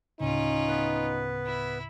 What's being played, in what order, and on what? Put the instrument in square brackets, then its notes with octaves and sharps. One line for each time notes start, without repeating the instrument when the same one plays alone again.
[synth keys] D2 A2 C#3 [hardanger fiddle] C#4 F4 [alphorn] D#4
[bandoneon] B3 B4
[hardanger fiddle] E4